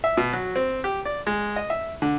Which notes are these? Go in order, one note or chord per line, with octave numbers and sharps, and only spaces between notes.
E5
B2
F#3
C4
G4
D5
G#3
D#5
E5
D3